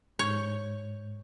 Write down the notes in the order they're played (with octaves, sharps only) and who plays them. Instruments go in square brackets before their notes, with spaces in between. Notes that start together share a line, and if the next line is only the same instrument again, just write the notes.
[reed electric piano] G#2 G6 [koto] C#5